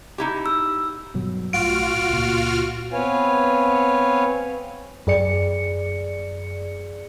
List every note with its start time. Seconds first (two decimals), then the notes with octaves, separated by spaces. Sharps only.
0.18 D#4 E4 G4
0.46 E6
1.14 G2 B2 F#3
1.53 B1 A2 F4 F#4 F6 D7
2.10 C#2 A#2
2.93 B3 C4 B4 C#5 F5 G#5
5.07 F#2 G#4 D5 C#7